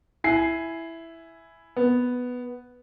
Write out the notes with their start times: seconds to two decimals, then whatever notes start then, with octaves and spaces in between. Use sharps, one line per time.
0.24 E4 G#5 C7
1.76 B3